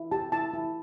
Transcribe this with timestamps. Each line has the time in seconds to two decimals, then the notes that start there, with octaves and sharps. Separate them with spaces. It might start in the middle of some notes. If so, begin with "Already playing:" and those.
Already playing: E4
0.11 G4 A5
0.32 E4 A5
0.53 E4